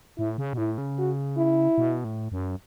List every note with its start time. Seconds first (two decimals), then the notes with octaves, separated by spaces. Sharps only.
0.18 A2 E4
0.38 C#3
0.53 B2
0.57 A2 E4
0.78 C#3
0.98 F#4
1.38 E4
1.78 B2
2.04 A2
2.32 F#2